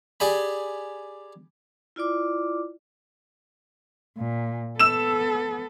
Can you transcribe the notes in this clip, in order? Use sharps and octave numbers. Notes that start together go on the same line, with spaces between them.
G4 G#4 D5 G#5 B5
E4 F4 D5 D6
A#2
B3 A4 E6 E7